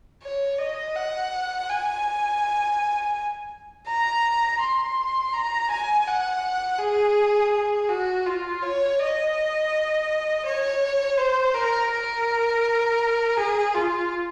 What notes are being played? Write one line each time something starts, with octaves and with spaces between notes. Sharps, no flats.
C#5
D#5
F#5
G#5
A#5
C6
A#5
G#5
F#5
G#4
G#4
F#4
F4
C#5
D#5
C#5
C5
A#4
A#4
G#4
F4